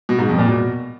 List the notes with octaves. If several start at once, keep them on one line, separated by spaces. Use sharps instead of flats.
B2
G#2
F2
A#2
B2